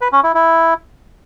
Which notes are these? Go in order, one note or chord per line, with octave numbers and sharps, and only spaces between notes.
B4
C#4
E4
E4